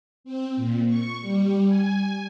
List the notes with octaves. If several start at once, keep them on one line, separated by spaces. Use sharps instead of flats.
C4
A#2
C#6
G3
G#5